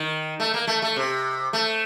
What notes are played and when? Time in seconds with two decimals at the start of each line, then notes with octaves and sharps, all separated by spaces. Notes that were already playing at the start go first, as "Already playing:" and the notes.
Already playing: D#3
0.40 A3
0.54 A#3
0.67 A3
0.82 A3
0.96 C3
1.53 A3